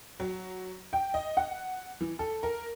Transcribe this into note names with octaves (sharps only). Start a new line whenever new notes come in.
F#3
G5
D#5
F#5
E3
A4
A#4